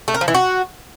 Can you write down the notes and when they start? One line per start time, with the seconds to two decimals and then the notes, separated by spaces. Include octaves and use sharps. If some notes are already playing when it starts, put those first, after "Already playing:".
0.08 A3
0.14 A#4
0.21 F3
0.28 E3
0.34 F#4